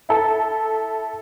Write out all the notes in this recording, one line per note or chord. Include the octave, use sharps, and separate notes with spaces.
E4 A4